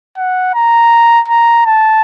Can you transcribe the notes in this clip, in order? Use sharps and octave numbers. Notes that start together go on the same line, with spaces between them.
F#5
A#5
A#5
A5